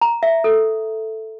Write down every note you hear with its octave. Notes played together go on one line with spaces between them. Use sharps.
A#5
E5
A4